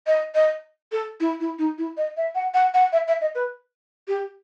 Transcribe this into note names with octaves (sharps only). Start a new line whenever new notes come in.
D#5
D#5
A4
E4
E4
D#4
E4
D#5
E5
F#5
F#5
F#5
E5
E5
D#5
B4
G4